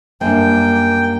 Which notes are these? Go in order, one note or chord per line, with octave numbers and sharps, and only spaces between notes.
F#2 G3 A#3 D4 G5